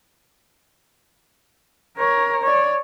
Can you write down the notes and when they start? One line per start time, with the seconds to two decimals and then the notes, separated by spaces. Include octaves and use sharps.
1.97 A#4 C#5
2.42 C#5 D5